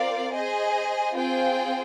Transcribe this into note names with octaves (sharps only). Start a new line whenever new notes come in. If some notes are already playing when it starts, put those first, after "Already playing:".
Already playing: C4 F4 A#4 D5 F5
G#4 C5 D#5 G#5
C4 F4 G#4 C5 G5